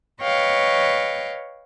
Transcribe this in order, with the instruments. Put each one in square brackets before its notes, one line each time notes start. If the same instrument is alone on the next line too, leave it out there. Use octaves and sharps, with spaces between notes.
[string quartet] B4 C#5 D#5 F5 G5 C#6